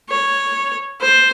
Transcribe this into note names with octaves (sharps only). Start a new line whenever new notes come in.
C#5
C5